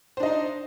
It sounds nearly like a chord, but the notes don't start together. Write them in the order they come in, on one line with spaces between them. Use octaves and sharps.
C5 D4 D#5 D#4